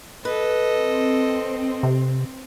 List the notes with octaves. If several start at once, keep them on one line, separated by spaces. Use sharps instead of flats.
A4 B4 D#5
C4
C3